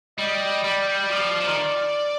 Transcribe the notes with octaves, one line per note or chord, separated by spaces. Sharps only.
G3 D#5
G3 D5
F3
F3
D#3